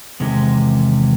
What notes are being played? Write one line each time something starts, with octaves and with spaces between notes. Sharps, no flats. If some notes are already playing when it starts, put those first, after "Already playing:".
E2 C3 D#3 G#3